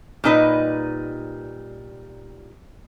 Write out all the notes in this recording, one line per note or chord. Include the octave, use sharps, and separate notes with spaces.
A#2 G3 D#4 B4 D#5